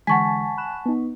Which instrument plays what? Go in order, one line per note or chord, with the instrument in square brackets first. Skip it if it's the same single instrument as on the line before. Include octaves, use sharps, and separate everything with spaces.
[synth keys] D3 E3 G#3 [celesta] F#5 C#6 B6 [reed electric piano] G#5 A5
[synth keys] B5 F#6 E7
B3 D#4